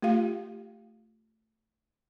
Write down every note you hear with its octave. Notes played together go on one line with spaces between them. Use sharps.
A3 F4 G4 F5